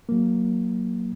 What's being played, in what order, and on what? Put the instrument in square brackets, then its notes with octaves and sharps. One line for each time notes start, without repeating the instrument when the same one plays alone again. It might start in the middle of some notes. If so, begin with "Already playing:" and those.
[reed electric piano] F#3 A#3